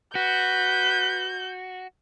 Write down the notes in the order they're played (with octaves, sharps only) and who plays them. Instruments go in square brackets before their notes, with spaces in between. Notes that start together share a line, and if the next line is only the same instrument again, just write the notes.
[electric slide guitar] F#4 [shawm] B4 [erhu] G6